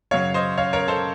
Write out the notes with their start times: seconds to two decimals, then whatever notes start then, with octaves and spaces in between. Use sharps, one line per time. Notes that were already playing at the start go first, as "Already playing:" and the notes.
0.11 F#2 C#3 F#3 C#5 F5
0.34 C5 D#5
0.58 C#5 F5
0.73 A#4 C#5
0.88 A4 C5